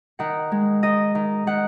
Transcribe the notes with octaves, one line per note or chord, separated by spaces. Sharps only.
D#3 F#5
G#3
D#3 D#5
D#3
D#3 F#5